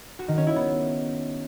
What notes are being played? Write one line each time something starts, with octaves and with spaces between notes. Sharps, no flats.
F#4
D#3
C#4
E4
B3